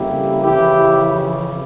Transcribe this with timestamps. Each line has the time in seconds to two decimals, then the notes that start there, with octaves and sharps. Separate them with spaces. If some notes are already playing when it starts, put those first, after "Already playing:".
Already playing: F2 C#3 G3 A#3 E4 G4
0.44 F2 C#3 E3 E4 G4